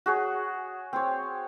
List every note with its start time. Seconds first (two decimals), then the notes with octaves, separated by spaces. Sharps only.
0.06 F#4 G#4 C#5
0.93 C4 C#5